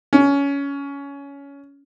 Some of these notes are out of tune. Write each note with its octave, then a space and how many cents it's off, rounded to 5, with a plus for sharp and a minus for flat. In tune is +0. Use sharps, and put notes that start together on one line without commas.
C#4 +20